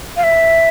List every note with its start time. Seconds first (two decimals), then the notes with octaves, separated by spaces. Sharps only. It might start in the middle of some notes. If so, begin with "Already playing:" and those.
0.17 F5
0.24 E5